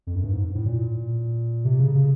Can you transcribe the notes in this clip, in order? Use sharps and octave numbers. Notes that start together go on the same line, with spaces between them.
F2
F#2
G2
G#2
A2
A#2
C3
C#3
C#3